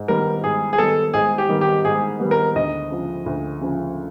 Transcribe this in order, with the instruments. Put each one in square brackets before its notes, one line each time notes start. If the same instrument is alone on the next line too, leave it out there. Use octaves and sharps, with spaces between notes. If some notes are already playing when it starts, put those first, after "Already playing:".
Already playing: [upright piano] G#2
[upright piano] D#3 G3 B3 [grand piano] A#4
[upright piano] G#2 [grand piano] G#4
[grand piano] G#4
[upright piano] D#3 G3 B3 [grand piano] A4
[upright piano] G#2 [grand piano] G#4
[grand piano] G4
[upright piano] D#3 G3 B3
[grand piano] G4
[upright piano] G#2 [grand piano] G#4
[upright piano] D#3 G3 B3
[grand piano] A#4
[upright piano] D2 [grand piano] D#5
[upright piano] C#3 F3
D2
C#3 F3